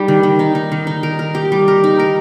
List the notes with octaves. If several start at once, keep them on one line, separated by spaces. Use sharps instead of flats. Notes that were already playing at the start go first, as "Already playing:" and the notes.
Already playing: G3 D#4 G4
D#3
D#3
D#4
D#4
D#3
D#4
A#4
A#4
G4
G3
A#4
D#4
A#4